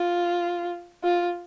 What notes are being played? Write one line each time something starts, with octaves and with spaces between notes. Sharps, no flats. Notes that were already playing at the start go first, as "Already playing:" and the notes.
Already playing: F4
F4